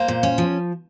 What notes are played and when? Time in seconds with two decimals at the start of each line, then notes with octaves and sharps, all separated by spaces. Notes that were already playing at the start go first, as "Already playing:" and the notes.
Already playing: A#3 C5
0.08 A#2
0.23 C#4
0.38 F3